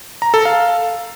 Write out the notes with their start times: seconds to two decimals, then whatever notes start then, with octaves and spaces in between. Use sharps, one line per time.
0.22 A#5
0.34 A4
0.45 F5